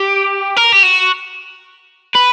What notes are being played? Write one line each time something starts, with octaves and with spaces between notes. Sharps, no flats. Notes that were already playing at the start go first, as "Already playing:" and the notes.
Already playing: G4
A#4
G4
F#4
B4